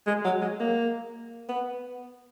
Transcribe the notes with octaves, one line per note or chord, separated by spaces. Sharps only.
G#3
F#3
G#3
A#3
B3